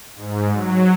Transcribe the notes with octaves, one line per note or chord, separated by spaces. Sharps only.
G#2
F#3